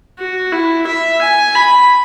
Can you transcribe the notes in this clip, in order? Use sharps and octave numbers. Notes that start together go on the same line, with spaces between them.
F#4
E4
E5
G#5
B5